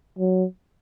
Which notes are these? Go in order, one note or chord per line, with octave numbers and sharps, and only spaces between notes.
F#3